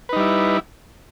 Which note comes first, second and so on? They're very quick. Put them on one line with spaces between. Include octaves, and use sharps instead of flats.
B4 D#4 G3 E4